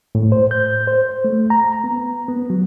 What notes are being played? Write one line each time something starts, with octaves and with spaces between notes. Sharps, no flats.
A2
C5
G6
C5
A3
A#5
B3
B3
F#3